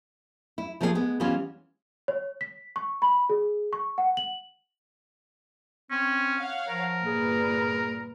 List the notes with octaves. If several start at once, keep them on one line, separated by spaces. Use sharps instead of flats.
E4
F3 A#3 C4 E4 G#4
G#3 B3
E3 G3 G#3 B3 C#4 F4
C#5
B6
C#6
B5
G#4
C#6
F#5
F#7
C4 C#4
C#5 F5 F#5
F3 A#4
G1 A#2 G#4 B4